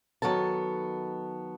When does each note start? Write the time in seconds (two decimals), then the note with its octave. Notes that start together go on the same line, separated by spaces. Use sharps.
0.22 D#3 F#3 B3 A4 A5